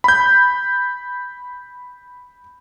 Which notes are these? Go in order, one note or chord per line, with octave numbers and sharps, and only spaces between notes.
B5 G6